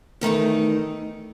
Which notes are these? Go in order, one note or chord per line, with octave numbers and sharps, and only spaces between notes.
E2 D#3 A3 D#4